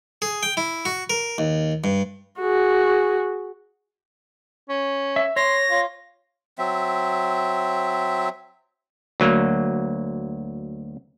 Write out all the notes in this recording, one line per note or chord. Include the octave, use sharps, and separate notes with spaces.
G#4
G5
E4
F#4
A#4
D#2
G2
F#4 G#4
C#4
E5
C#5 C6 A#6
F4
F#3 C4 E5
D2 F#3 A#3